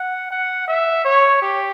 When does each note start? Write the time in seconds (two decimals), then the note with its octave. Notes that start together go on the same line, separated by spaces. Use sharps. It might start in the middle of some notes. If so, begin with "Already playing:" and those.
Already playing: F#5
0.31 F#5
0.68 E5
1.05 C#5
1.42 G4